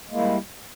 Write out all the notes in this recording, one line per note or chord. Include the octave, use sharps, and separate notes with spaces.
G3 G#3 A#3 E4